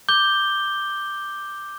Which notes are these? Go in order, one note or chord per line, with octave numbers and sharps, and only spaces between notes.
D6 G6 G7